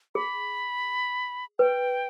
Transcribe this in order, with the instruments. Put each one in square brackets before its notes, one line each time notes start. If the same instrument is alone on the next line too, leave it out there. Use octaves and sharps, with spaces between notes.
[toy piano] G#4 [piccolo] B5
[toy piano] B4 [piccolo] G5